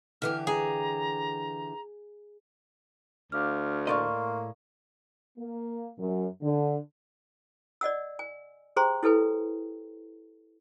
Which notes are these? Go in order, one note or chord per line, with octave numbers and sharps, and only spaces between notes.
D3 E3 G4 F6
G#4 A#5
D2 F5 D6 F6
A2 A#3 D5 D#5 C6 C#6 F6
A#3
F#2
D3
D5 D#5 F#5 E6
G#5
G4 G#4 C5 G5 A#5 C6
E4 G4 A4 B4 G#5